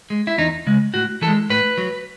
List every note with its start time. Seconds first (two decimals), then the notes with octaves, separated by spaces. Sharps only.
0.10 G#3
0.27 E4
0.38 E2 D#4
0.67 C#3 G#3
0.94 A2 F#4
1.22 E3 A4
1.27 G#3
1.50 A2 B4
1.78 F#3